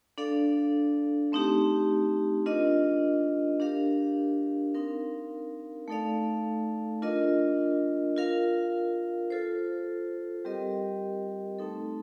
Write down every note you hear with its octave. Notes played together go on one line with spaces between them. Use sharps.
D4 A4 D5 F5
A3 C4 D#4 G4
D4 F4 A#4 D#5
D4 G4 A#4 F5
C4 D#4 A#4 F5
A3 D#4 A4 D5 F5
D4 F4 A#4 D#5
F4 A#4 F5
F4 A4 C5
G3 C4 G4 A#4 D#5
A3 C4 D#4 A4